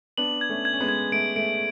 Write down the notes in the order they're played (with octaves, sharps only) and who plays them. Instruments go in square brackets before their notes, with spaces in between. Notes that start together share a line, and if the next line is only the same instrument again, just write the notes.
[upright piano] B3 D4 [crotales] F#7
[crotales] G#6
[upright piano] A3 C#4
[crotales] G#6
[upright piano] C#4
G#3 B3
[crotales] G#6
[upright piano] A3 [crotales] D7
[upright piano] A3 [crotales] D7